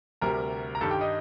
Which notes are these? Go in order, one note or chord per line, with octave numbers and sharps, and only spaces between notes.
D2 C3 G3 A#4 A#5
A#5
G2 D#3 G3 A4 A5
G4 G5
D#4 D#5